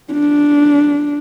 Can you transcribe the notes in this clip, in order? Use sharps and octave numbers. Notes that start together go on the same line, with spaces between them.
D4